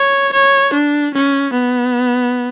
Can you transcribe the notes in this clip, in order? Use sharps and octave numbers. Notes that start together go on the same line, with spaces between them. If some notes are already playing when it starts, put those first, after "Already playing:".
Already playing: C#5
C#5
D4
C#4
B3